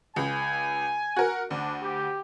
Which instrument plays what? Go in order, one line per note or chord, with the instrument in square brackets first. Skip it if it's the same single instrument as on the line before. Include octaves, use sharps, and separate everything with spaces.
[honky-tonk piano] C#2 [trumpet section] G#5
[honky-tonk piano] F#4 A#4
[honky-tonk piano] D2 [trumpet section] D4
[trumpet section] G4